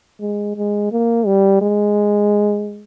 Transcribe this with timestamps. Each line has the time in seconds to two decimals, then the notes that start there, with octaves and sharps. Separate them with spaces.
0.21 G#3
0.57 G#3
0.92 A#3
1.26 G3
1.61 G#3